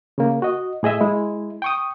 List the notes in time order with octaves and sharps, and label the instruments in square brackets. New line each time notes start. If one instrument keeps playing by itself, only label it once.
[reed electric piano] C#3 A#3
F#4 D#5
A2 G#4 D#5 E5
G#3 E4
G5 C#6 D#6